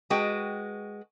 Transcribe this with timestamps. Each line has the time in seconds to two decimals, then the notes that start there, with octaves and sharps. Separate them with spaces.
0.10 G#3 F#4 B4 G5